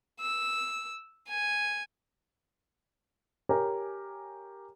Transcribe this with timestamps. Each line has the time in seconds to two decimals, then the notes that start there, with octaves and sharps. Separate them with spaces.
0.21 E6
1.29 G#5
3.49 G4 A#4 C#5 G#5 A#5